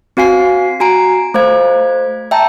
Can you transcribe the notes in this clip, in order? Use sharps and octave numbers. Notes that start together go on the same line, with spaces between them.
C4 F#4 F5 G#5 C7
F#4 G#5 A#5 D7
A3 C5 F5 G#6
E5 G5 A5 A#5